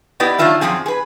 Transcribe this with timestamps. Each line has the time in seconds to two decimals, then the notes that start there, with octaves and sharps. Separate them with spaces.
0.20 B3 E4 G4 B4 D5 D#5
0.38 D#3 F#3 D4 F4 E5 F5
0.61 F#2 C#3 F3 C4 G#4
0.86 G#4 B4